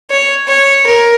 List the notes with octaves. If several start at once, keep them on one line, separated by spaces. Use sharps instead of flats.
C#5
C#5
A#4